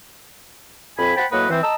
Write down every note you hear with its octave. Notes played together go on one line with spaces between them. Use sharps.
F2 G#5 B5
C5 F#5 G5 A5 B5
A2 F#3 A#3 B4 D#5 F#5
E3 C4
D#5 A5 A#5 E6